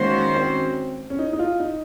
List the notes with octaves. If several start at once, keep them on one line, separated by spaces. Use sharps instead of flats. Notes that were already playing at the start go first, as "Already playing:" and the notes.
Already playing: D#3 G#3 A#3 C#4 F#4 C5
C4
C#4
D#4
D#4
F4
D#4